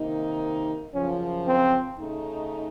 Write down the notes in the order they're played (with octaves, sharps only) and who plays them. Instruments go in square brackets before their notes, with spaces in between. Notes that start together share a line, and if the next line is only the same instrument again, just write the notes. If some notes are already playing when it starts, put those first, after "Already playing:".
Already playing: [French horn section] C3 D#3 A#3 D#4
[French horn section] F#2 C#3 F3 [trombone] C#4
[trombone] C4
[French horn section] C#3 A3 D#4